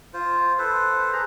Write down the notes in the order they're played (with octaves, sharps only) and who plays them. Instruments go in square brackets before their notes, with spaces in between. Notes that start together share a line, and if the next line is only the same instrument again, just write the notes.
[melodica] F4 C5
A4 B4 C5
G#4 A#5